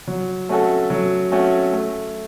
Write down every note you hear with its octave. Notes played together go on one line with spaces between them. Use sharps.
F#3
A3 C#4 F#4 A4
F#3
A3 C#4 F#4 A4
A3